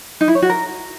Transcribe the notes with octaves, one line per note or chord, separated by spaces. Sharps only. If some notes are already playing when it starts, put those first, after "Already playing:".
D#4
E4
C#5
F#4
A#4